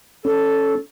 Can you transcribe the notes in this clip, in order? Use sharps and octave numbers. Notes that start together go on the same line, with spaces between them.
C#4 A4